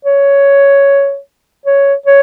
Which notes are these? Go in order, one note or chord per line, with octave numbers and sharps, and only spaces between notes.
C#5
C#5
C#5